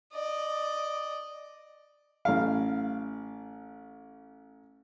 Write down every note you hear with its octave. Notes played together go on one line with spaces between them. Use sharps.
D5 D#5
A1 F5